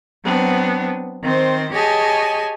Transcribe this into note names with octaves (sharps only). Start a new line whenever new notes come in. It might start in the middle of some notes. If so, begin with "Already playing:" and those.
F#3 B3 C4 D4
D#3 C4 C5
G4 G#4 C#5 D#5 G#5 A5